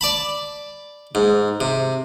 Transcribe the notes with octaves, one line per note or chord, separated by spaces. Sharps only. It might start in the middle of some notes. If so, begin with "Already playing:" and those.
D5 A5 B5
G#2
C3